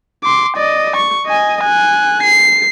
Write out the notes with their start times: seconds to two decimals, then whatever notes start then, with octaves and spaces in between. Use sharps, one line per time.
0.23 C6 D6
0.57 D5 D#5
0.96 C#6
1.27 D#5 G#5
1.62 G#5 F#6
2.23 C7